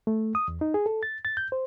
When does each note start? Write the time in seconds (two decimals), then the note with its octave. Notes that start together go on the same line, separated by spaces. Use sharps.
0.07 A3
0.35 D#6
0.48 E2
0.61 D#4
0.74 G#4
0.86 A4
1.03 A6
1.25 A6
1.37 G6
1.52 C5